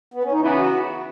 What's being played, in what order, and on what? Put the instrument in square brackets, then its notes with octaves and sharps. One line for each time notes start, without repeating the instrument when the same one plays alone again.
[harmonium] B3
C#4
D#4
[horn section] C#3 E3 B3 [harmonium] E4
[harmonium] F#4